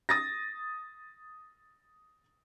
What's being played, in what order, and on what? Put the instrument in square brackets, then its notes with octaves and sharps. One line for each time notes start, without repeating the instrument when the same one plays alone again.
[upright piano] D#6 A6 A#6